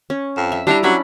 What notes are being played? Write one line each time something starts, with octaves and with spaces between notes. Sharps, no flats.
C#4
F2
E5
G3 D4 E4 A#5
F#3 C#4 D4 B5